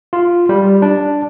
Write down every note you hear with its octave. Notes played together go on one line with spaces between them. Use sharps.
F4
G3
D4